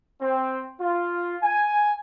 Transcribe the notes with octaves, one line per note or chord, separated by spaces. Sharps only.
C4
F4
G#5